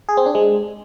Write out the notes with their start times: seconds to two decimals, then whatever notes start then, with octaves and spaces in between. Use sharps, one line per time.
0.09 G#4
0.17 C4
0.26 D4
0.35 G#3